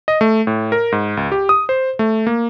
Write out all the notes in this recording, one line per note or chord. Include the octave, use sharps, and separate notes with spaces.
D#5
A3
A2
A#4
G#2
C#2
G4
D#6
C5
A3
A#3